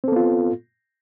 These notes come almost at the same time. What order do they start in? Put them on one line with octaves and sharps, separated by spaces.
C4 A4 B3 F4